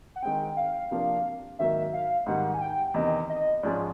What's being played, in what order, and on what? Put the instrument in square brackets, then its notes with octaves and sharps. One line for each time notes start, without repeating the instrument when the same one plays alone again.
[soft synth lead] F#5
[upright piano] D#3 G#3 C4 [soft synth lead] G5
[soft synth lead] F5
[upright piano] C3 F3 A#3 D4
[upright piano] G#2 D#3 F#3 A#3 [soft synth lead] E5
[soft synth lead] F5
[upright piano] G#2 D#3 G3 [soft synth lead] F#5
[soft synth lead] G#5
G5
[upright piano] E2 C3 D#3 [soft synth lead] D#5
[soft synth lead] D#5
[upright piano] G#2 F3 G#3 C#4 [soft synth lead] D5